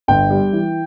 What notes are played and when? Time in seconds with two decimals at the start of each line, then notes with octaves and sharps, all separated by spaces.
0.08 G1 G5
0.30 G3
0.53 E3